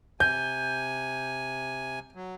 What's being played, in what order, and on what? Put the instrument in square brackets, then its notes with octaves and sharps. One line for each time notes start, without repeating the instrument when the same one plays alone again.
[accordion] C3 G#5 [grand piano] G6
[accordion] F#3